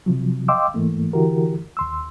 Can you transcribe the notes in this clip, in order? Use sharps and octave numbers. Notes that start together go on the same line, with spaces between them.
C3 F3 F#3
D#5 F5 G5 C6 D6 E6
G#2 E3 A3 A#3
D3 E3 E4 F#4 G4 A#4
D#2 C6 E6